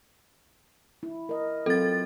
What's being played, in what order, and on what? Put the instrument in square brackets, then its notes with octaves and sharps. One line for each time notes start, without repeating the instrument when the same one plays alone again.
[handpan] E4
A#4 D#5
[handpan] F#3 C4 F4 [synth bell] A4 A6